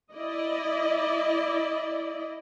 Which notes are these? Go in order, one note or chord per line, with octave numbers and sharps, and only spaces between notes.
E4 D5 D#5